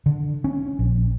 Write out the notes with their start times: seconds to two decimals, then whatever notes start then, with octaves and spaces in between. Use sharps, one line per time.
0.06 D3
0.44 C#4
0.79 A#1